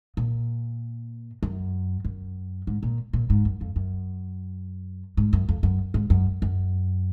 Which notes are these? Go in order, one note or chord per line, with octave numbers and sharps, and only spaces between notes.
A#2
F#2
F#2
G#2
A#2
A#2
G#2
F#2
F2
F#2
G#2
F#2
F2
F#2
G#2
F#2
F#2